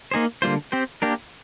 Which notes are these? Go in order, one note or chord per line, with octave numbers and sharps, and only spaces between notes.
A#3 D#4 G#4 C5
D3 G3 A#3 F4 C5
C4 G4 C5
A#3 D4 G4 A#4